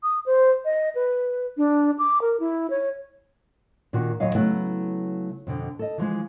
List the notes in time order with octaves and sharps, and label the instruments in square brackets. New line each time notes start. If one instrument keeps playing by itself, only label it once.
[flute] D#6
C5
D#5
B4
D4
D6
A#4
E4
C#5
[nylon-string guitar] A#2 D#3 F4 F#4
D#2 A#2 F#3 D#5 F5
C#3 F#3 A3 B3 E4
F2 B2 D3
A4 D#5
E3 F3 G#3